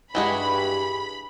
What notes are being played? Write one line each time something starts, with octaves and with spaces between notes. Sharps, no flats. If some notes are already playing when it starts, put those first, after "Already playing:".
G2 E3 G#3 F#4 B5